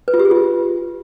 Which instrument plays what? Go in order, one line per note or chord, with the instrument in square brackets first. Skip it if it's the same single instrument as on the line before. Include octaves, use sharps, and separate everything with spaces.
[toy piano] B4
F4
G4
G#4
F4